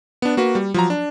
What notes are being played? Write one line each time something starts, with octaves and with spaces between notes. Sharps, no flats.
B3 D4
A#3 F#4 B4
G3
F3 F#3 A#5
D4